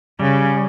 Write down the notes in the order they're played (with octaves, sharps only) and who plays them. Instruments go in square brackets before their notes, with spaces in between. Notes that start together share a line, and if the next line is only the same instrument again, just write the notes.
[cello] C#3 [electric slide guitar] G3